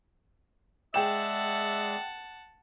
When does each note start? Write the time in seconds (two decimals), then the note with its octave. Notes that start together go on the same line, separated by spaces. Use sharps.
0.94 G#3 G#4 D5 E5 F#5 G5 A5 E7